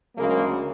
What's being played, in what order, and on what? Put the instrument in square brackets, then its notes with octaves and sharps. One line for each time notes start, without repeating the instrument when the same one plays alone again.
[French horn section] D2 C#3 F#3 G#3 A#3